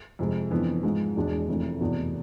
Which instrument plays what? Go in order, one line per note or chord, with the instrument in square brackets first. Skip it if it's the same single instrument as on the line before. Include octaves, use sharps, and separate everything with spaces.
[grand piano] F2 C3 G#3
F2 E3 B3 D4
G#2 F3 G#3
E1 E2 B2 G#3 D4
F1 F2 E3 A3
F1 E2 B2 B3